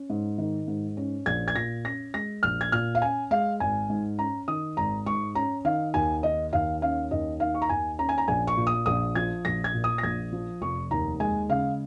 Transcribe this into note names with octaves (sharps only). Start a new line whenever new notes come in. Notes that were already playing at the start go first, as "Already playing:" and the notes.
Already playing: C#4
G#2
D#3
G#2
C#4
A#1 G#6
G#6
A#2 A#6
C#4 A#6
G#3 A#6
A#1 F6
G#6
A#2 F6
F5
C#4 G#5
G#3 F5
G#1 G#5
G#2
C#4 A#5
D#3 D#6
G#1 A#5
G#2 C#6
C#4 A#5
D#3 F5
D#2 G#5
D#3 D#5
D#2 F5
C#4 F5
D#2 D#5
D#3 F5
C#6
A#5
D#2 G#5
C#4 A#5
G#5
A#5
A#1 G#5
C#6
A#2
D#6
A#1 D#6
F3 G#6
A#1 A#6
G#6
A#2
D#6
A#6
A#1 G#6
F3
F1 C#6
D#2 A#5
G#3 G#5
C#3 F5